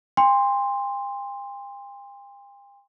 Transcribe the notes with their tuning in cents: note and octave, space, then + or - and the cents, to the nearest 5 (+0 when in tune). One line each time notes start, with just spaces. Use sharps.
G5 +45 C6 +0